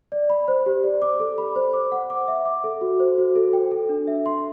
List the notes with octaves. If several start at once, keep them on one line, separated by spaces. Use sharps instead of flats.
D5
B5
C5
G4
D5
D6
A4
B5
C5
D6
F#5
D6
E5
D6
A4
F#4
C5
F#4
A4
G5
A4
D4
E5
C6